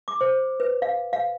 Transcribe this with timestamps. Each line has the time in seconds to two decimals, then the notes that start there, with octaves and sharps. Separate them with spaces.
0.08 D6
0.21 C5
0.60 B4
0.82 F5
1.13 F5